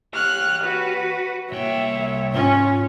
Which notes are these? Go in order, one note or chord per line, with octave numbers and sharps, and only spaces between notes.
G4 C#5 F6 F#6
F#4 B4
C2 A#3 C#5 E5 G5
G#2 C#4 F4